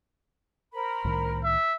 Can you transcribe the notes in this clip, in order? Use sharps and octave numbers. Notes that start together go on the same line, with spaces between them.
A#4 C5 B5
C2 A2 D#3
E5